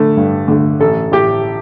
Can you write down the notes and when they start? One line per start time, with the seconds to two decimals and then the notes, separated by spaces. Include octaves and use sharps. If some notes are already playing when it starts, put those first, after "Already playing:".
Already playing: D3 A3
0.17 G2
0.48 D3 A3
0.80 A1 A4
1.12 A2 A3 G4